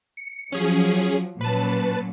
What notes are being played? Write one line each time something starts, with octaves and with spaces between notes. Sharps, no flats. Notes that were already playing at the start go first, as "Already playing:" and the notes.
C#7
F3 F#3 C#4 G#4
A#2 F#3 C#4 B4 A5